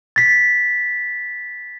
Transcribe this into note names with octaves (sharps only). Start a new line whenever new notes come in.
A6 B6